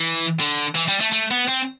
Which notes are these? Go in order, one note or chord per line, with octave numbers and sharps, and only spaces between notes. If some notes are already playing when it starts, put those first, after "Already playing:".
Already playing: E3
D3
E3
G3
A3
A3
B3
C4